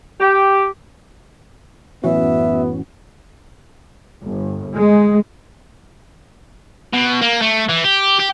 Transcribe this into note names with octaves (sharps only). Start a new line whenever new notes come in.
G4
F#2 A2 E3 B3 C#4 F#4 E5
G1
G#3
B2
A#3
A3
E3
G4
G4